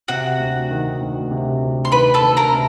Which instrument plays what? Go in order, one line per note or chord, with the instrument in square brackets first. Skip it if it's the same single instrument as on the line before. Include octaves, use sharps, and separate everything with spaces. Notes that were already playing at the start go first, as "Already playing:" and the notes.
[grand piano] C3 [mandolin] F#4 F#5
[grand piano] D2
D#3
D2
C3
D2
[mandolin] C6
[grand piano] D#3 [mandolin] B4 B5
[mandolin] A4 A5
[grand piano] D2
[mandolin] A#4 A#5
[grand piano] C3